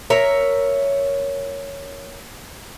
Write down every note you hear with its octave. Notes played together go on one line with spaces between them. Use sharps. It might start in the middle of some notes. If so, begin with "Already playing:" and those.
A#4 C#5 E5